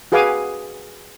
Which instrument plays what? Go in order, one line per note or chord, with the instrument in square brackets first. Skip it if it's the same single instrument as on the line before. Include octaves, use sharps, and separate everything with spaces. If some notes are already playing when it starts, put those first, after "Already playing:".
[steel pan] F#4 G#4 B4 F5 G#5 D6